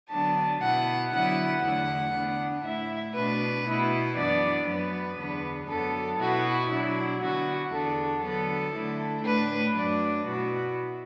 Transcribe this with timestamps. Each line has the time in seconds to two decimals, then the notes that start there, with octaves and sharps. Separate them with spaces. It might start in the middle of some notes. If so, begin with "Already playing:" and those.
0.11 D3 F#3 B3 D4 A5
0.62 B2 B3 E4 F#5
1.12 D3 F#3 B3 E4 F#5
1.63 E2 D3 A3 E4 F#5
2.14 D3 B3 D4
2.65 A2 A3 E4 E5
3.16 B2 A3 D4 B4
3.67 B2 B3 E4
4.17 F#2 E3 B3 D4 D5
4.68 F#2 F#3 B3 B4
5.18 E2 D3 B3 D4
5.69 F#2 F#3 B3 D4 A4
6.20 B2 B3 E4 F#4
6.70 B2 F#3 D4 E4
7.21 D3 B3 E4 F#4
7.72 E2 D3 B3 D4 A4
8.23 D3 F#3 B3 A4
8.74 D3 A3 E4
9.24 A2 A3 D4 B4
9.75 F#2 F#3 A3 D4 D5
10.25 B2 B3 E4 F#4